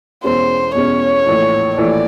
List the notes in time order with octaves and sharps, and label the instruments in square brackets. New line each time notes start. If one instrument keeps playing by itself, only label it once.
[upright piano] E2 B2 G#3 C#4 [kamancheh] C5
[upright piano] E2 B2 G#3 C#4 [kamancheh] C#5
[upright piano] A#1 A2 E3
[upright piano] A#1 A2 E3 [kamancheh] D5